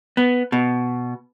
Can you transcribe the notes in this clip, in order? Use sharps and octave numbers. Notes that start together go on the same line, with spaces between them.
B3
B2